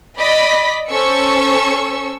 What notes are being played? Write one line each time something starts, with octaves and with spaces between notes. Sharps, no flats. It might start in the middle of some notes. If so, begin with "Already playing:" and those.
D5 D#5 B5 B6
C#4 A4 C5 C#6 E6 C#7